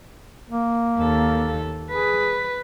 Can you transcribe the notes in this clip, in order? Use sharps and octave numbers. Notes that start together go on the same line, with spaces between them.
A#3
D#2 A4
G#4 B4